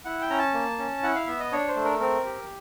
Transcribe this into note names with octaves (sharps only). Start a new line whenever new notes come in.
E4 F#5
G5
C#4 A#5
A5
A#3
C#4
E4 F#5
F5
B3 E5
D#5
D4 C#5
C5
A3
A#4
C4 A#4
G4